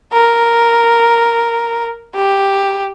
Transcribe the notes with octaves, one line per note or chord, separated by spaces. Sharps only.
A#4
G4